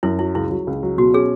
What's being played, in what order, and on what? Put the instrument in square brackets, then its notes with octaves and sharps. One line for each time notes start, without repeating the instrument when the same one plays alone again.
[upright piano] F#2 [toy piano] E4
[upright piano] F#3 [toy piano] E4
[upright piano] C#2 [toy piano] E4
[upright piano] F#3
C#2
F#3
[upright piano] B2 [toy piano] F#4
[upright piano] C#4 [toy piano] G#4